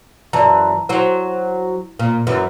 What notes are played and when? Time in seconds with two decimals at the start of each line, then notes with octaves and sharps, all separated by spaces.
0.33 F#2 E3 D5 A5 A#5
0.89 F#3 E4 C5
1.99 A#2
2.27 F#2 E3 B4